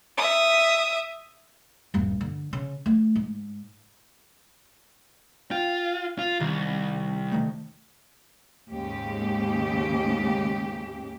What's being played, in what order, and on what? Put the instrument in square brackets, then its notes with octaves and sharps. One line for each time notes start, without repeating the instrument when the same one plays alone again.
[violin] E5 D#6
[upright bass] D#1 G2
D3
C#3
A3
G#2
[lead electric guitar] F4 [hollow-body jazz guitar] G5
[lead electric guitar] F4
[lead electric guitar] C2 [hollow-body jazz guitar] D#3
[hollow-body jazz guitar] D#3 A3
[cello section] D#2 G#2 C#3 G4